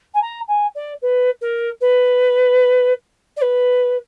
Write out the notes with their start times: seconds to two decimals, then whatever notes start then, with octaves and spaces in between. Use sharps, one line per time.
0.14 G#5
0.22 A#5
0.48 G#5
0.75 D5
1.02 B4
1.41 A#4
1.81 B4
3.36 D5
3.41 B4